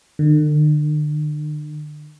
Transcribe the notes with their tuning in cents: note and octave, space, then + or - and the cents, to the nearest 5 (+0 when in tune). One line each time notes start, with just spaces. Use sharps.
D3 +45